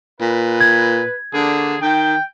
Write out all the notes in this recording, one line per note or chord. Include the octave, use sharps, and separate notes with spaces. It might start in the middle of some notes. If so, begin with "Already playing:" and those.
A#2 B4
G#6
D3 A#3 D4 G#4
D#3 G5